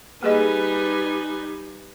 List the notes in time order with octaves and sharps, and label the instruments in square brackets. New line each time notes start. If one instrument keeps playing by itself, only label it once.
[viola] G3 D#4 [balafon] A#3 G#4 D#5 [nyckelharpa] B4 G#5